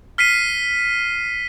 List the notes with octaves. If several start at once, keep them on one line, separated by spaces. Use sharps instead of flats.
F6 B6 C7 D#7